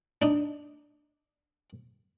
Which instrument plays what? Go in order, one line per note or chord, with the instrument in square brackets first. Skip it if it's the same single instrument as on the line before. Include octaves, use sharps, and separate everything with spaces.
[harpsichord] D4 D#4